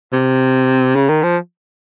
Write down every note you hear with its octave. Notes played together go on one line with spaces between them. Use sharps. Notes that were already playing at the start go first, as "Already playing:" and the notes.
C3
C#3
D#3
F3